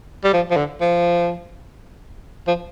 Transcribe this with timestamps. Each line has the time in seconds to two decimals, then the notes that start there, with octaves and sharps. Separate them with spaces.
0.24 G3
0.33 F3
0.51 F3
0.56 D3
0.81 F3
2.47 F3